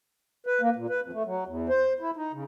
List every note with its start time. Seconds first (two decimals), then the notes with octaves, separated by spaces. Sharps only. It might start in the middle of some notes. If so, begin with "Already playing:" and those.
0.46 B4
0.61 A#3
0.76 A#2
0.89 B4
1.01 F2
1.13 A3
1.26 F#3
1.47 E2
1.69 C5
2.00 E4
2.17 D#4
2.33 C#3